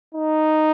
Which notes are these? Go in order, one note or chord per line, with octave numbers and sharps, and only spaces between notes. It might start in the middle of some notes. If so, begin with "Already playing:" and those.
D#4